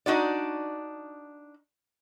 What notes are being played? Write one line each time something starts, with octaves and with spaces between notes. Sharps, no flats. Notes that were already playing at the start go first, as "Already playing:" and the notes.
D4 D#4 F#4 D5